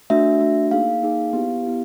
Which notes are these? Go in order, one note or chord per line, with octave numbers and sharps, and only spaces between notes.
A3 D4 F#4 E5
A3 D4 F#4
A#3 D#4 G#4 F5
A#3 D#4 G#4
B3 E4 G4
B3 E4 G4